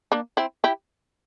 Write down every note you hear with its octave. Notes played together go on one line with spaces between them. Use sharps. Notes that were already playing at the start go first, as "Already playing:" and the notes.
A#3 D4
C4 E4
E4 G4